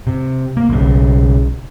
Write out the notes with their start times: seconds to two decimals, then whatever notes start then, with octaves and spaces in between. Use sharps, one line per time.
0.07 C3
0.57 A#3
0.69 B1 C#3